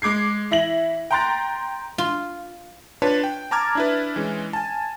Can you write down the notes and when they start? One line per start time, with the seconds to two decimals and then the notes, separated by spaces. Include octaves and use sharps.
0.02 G#3 D6 G#6 C7
0.51 E3 E4 A#6 F#7
1.11 G5 A#5 C6 F#6 A6
1.98 F4
3.02 D4 F4 B4 C#5 A5
3.24 G5
3.51 A5 A#5 D6 F6 G#6 A6
3.75 D4 E4 B4
4.16 E3 G#3 C#4
4.53 G#5 A5